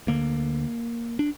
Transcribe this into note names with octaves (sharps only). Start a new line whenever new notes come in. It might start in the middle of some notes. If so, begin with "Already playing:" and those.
D2 D3 A#3
D4